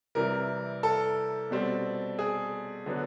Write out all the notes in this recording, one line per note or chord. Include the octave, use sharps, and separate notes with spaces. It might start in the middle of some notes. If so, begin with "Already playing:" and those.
C3 E3 G3 A#4
A4
B2 G3 C4
G#4
D3 F#3 B3 D4